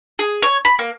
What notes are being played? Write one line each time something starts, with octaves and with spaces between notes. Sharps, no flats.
G#4
C#5
B5
A#3